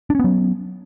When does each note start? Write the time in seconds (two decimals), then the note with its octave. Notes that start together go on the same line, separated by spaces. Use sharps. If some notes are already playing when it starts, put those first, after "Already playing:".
0.10 D4
0.15 C#4
0.19 B3
0.24 F#3